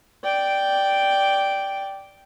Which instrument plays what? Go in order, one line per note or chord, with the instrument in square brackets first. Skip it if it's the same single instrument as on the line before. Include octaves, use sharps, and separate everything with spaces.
[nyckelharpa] D5 G5